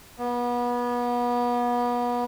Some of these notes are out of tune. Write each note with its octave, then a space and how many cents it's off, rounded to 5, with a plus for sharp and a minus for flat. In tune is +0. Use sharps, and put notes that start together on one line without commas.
B3 -30